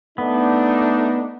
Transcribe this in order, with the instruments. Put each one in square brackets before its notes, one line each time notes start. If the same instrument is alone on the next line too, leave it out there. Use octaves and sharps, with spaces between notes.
[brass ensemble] A3 D4 D#4 [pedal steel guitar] B3